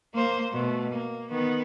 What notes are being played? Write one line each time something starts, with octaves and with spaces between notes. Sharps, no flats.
A#3 C5
B2 A3
A#3
D#3 B3